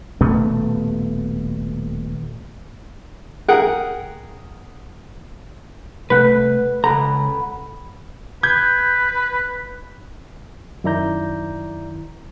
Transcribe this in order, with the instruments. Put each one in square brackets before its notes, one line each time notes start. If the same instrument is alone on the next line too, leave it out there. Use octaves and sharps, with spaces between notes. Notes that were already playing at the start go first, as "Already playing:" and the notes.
[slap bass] D#1 B2 A3 B3
[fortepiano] G#4 A#4 F#5 G5
[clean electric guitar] C2 A3 F#5 [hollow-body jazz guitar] B4
[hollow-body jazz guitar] C#2 A#5 [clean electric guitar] A4 F#5 B5
[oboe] B4 [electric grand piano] G6 G#6
[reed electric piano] F#2 D#3 E4 D5 A#5 G6